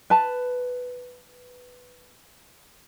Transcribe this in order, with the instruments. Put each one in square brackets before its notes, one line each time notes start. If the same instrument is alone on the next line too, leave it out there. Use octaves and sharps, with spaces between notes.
[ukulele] B4 A5